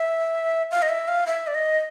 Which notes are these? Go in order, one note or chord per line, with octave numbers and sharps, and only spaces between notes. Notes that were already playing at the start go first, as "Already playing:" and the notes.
Already playing: E5
F5
D#5
E5
F5
E5
D5
D#5